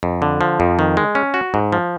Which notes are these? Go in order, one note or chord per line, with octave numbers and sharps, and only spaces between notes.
F2
D3
F3
F2
D#3
G#3
C#4
F#4
G#2
F3